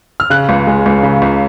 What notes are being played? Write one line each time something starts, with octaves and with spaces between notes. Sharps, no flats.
F6
C#3 F#6
C#2
G#3
C#2
C#3
C#2